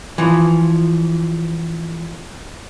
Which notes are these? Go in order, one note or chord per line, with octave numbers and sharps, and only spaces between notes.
E3 F3